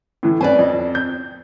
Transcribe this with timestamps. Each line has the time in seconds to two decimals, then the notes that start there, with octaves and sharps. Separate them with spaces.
0.23 A2 E3
0.41 C4 C#4 B4 D5 G#5
0.59 F2
0.95 G6